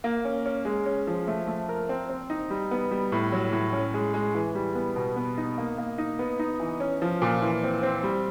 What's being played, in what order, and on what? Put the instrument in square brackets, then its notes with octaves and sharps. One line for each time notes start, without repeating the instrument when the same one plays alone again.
[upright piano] A#3
C#4
C#4
G#3
C#4
F3
A3
A3
A#4
C4
C4
D#4
G3
B3
G3
A2
F#3
A2
C#4
G#3
G#3
E3
G3
B3
B2
B3
D#4
A#3
A#3
D#4
B3
D#4
E3
C#4
F3
A#2
E3
C4
C4
G3